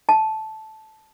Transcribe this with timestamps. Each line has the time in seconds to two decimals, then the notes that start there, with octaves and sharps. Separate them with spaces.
0.09 A5